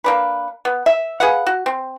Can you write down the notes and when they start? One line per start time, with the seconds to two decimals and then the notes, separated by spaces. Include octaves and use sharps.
0.04 A#3 D4 B4
0.65 B3
0.86 E5
1.20 G#4 B4 F5 F#5
1.47 F#4
1.66 C4